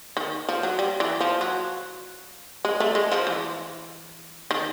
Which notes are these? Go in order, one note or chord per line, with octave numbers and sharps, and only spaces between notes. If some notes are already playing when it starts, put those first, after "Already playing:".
D#3
F3
F#3
G3
E3
F3
F#3
G#3
A3
G#3
F3
E3
D#3